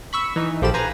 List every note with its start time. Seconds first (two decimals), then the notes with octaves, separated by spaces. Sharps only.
0.13 B5 C#6 E6
0.36 E3 D#4
0.62 A#1 F3 G4 A4 B5 E7
0.74 B4 C5 G#5 A#5